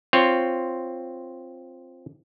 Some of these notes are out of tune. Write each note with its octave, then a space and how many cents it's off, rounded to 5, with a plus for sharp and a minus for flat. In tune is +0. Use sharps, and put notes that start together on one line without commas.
C4 +0 F4 +0 C#5 +0